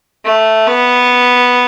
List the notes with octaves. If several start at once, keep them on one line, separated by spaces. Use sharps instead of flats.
A3
B3